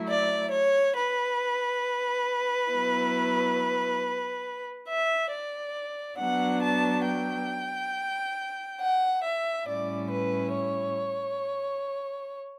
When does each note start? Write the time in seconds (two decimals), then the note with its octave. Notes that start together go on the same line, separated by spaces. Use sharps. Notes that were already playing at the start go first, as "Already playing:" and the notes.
Already playing: F#3 A3 E4
0.09 D5
0.52 C#5
0.97 B4
2.70 F#3 B3 E4
4.89 E5
5.32 D5
6.19 F#3 B3 D4 F#5
6.62 A5
7.06 G5
8.80 F#5
9.25 E5
9.68 A2 G3 C#4 E4 D5
10.12 B4
10.54 C#5